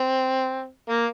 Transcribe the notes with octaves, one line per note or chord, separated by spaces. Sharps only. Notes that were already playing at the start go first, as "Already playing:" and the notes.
Already playing: C4
A#3